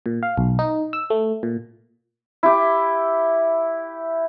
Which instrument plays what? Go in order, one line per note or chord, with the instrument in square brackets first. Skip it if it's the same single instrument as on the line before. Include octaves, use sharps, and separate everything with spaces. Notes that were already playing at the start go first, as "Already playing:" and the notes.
[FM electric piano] A#2
F5
B1
D#4
E6
A3
A#2
[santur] E4 G4